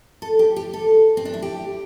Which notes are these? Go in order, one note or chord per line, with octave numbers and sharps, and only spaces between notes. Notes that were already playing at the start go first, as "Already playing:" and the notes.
A4
G4
G4
A4
C4
D4
E4
G4